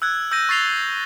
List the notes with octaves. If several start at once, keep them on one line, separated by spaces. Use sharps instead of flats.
E6 F#6 G#6
E6 G6 A#6 D#7
C#6 A6 C7 F7 G7